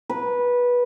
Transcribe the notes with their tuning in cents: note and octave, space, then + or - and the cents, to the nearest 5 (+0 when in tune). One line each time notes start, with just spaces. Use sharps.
B4 -15